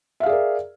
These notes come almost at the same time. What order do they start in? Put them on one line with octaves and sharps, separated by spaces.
E5 F5 G#4 D5 A#4